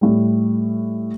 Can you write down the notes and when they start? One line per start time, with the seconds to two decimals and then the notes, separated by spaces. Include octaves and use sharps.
0.01 A2 G3